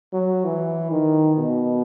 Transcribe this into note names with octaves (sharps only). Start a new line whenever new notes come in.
F#3
E3
D#3
B2